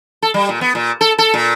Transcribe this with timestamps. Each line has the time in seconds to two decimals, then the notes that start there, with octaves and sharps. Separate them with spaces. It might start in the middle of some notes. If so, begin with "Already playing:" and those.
0.22 A4
0.34 G3
0.49 A#2
0.61 B3
0.75 A#2
1.01 A4
1.18 A4
1.34 A#2